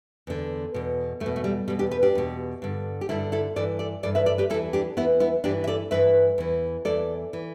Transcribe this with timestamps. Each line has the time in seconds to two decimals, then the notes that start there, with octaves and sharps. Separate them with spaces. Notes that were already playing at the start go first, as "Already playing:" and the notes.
0.27 E2 D3
0.74 E2 B2
1.20 E2 A3
1.26 B2
1.36 A3
1.44 G3
1.68 E2 B2 G3
1.79 D4 G4
1.91 G4 B4
2.03 D4 G4
2.15 E2 B2
2.62 G2 D3
3.01 G4
3.09 G2 D3 E4 A4
3.32 E4 A4
3.56 G2 E3 A4 D5
3.79 A4 D5
4.03 G2 E3 A4 D5
4.15 B4 E5
4.26 A4 D5
4.38 G4 B4
4.50 E2 E4 A4
4.54 E3
4.73 D4 G4
4.97 E2 E3 B3 E4
5.20 B3 E4
5.44 G2 E3 D4 G4
5.64 E5
5.67 A4 D5
5.91 G2 E3 B4 E5
6.38 E2 E3
6.85 E2 E3 A4 D5
7.33 E3